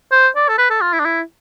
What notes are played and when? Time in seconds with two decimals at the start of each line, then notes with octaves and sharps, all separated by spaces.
0.12 C5
0.36 D5
0.49 A4
0.58 B4
0.70 A4
0.81 F4
0.93 E4
0.99 D4
1.05 E4